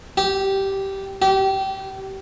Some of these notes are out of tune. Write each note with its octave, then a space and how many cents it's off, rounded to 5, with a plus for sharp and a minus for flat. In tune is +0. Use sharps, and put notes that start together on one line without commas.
G4 -10
G4 -25